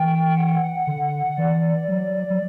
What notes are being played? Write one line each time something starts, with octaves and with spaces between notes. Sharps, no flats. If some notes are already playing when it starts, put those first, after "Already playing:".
Already playing: E3 G5
F#5
D3
E3 D5
F#3
F#3